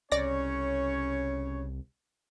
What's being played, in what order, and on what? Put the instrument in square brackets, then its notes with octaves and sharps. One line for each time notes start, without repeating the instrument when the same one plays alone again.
[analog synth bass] C2 [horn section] C#3 C#4 C#5 [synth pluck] D5 A#6